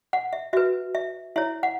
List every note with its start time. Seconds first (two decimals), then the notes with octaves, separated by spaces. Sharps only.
0.13 F#5
0.33 E5
0.53 F#4 B4 E5
0.95 E5
1.36 E4 C#5 E5
1.63 F#5